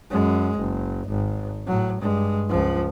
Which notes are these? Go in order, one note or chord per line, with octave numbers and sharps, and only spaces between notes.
F#2 G#3
F#1
G#1
A2 F#3
G2 G#3
C#2 F3